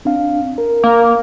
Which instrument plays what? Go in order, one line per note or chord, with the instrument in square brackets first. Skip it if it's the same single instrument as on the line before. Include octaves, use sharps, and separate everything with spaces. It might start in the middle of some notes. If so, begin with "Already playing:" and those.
[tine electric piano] C4 D4 F5
A#4
[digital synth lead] A#3